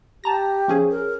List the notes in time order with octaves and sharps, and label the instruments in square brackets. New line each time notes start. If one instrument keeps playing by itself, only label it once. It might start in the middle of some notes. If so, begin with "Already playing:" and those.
[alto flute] G4 [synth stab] A5 A#5 A#6
[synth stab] F3 C#4 G#4
[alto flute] A#4